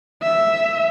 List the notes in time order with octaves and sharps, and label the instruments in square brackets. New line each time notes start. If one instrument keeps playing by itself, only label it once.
[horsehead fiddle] E5